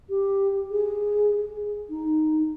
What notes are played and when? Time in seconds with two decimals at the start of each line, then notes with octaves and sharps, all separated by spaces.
0.09 G4
0.71 G#4
1.90 D#4